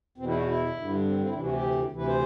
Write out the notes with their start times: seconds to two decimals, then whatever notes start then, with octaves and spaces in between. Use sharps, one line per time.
0.18 E2 B2 C4
0.27 E4
0.37 F#4
0.47 E4
0.76 G2 D3
1.05 C4
1.20 C4
1.27 E4
1.34 D2 C3 E3 D4
1.44 F#4
1.54 G4
1.92 D2 C3 E3 B4
2.07 C5